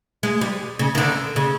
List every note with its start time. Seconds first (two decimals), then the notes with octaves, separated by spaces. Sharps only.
0.23 G#3
0.41 G3
0.79 C#3
0.95 D#3
0.98 D3
1.36 C#3